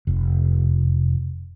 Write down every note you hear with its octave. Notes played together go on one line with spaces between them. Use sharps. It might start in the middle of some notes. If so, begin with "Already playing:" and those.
F1